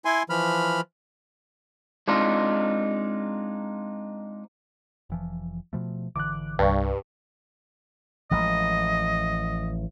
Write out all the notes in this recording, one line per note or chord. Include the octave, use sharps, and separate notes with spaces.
E4 G#5 C6
E3 F3 B5 F6
G#3 C4 D4 D#4 F4
F1 E3 F3
B2 F3 A3
G#1 D3 E3 D6 F#6
C2 G2 C#6
A1 F3 G#3 D#5